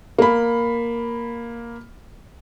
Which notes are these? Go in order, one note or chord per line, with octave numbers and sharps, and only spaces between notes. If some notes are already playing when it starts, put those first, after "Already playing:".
A#3 B5